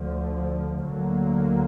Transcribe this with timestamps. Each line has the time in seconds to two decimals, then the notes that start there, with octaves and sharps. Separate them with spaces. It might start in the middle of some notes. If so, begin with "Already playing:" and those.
Already playing: D2 D3 F3
0.86 D2 D3 F#3 A#3